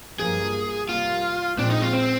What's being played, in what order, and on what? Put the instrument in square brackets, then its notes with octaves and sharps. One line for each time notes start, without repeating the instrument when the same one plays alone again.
[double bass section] G2 F3 A#3 [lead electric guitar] G#4
[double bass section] C3 G3 A#3 [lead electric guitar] F4
[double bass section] A#2 F3 G#3 C4 [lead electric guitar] D4
[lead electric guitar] D#4
F4
C4